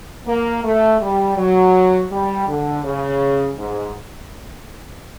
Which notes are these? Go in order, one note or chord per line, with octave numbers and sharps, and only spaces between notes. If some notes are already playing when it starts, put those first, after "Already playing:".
A#3
A3
G3
F#3
G3
D3
C#3
G#2